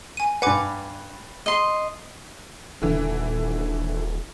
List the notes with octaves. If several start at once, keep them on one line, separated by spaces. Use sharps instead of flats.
G#5 D#7
G2 B4 F#5 G#5 D6
D#5 C6
D#1 D3 E3